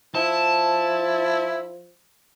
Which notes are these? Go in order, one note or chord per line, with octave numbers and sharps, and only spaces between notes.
F3 E4 A5